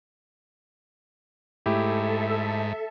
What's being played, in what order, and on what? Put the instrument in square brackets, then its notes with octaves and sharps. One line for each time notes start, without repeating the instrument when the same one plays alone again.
[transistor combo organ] G#2 [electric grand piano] A3 E4 G4 [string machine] A4 E5